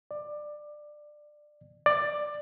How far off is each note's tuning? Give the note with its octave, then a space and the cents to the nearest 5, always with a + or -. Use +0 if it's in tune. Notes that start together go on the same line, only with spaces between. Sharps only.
D5 +20
D5 +15